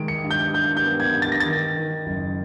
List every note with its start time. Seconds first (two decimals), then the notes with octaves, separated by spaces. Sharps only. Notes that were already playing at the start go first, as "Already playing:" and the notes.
Already playing: D#3 G#3 D7
0.08 C#7
0.24 G2
0.31 G6
0.54 G2 G6
0.77 G6
0.85 B3
1.00 G#6
1.15 G2
1.22 A6
1.32 A#6
1.40 A6
1.46 D#3
1.76 D#3
2.06 F#1